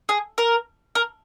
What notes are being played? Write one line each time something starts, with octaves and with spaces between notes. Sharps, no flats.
G#4
A#4
A#4